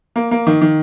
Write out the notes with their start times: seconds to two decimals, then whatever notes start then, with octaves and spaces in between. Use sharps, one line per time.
0.16 A#3
0.31 A#3
0.47 D#3
0.62 D#3